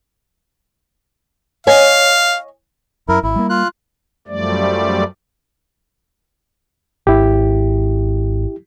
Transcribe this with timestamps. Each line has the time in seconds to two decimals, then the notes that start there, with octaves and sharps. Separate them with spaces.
1.67 C#5 D#5 F5 G#5
3.08 F#2 E4 A#4
3.23 G#1 E4
3.36 G3 A#3
3.49 F4 F#6
4.28 F#2 F3 G3 A3 D5
7.07 G#1 E4 G4